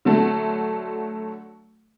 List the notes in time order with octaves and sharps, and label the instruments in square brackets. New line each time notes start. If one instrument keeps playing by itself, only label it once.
[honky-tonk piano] D3 F#3 A3